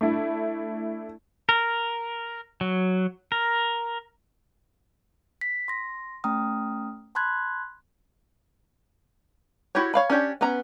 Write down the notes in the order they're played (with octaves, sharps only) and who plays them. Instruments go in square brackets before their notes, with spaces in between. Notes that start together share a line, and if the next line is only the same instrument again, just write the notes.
[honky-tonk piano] A3 D4 E4
[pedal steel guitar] A#4
F#3
A#4
[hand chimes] B6
C6 A#6
A3 C#4 G5 A#5 D#6 F6
A5 B5 C6 F#6 G#6
[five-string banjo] E4 F#4 G4 C#5
C#5 F5 B5
C#4 D4 G4 C#5
B3 C#4 A#5